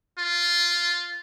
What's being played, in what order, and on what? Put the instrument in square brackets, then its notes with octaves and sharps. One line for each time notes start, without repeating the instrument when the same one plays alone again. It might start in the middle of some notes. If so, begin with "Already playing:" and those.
[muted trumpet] F4